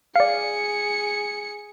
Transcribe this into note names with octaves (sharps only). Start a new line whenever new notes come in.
G#4 D5 F5 C#7